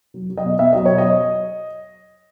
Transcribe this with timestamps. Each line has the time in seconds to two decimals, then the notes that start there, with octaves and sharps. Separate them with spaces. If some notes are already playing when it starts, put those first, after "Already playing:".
0.14 F#3
0.30 F#3
0.37 D#5
0.44 B2
0.59 B2 E5
0.73 F#3 D#5
0.85 F#3 C#5
0.98 D#5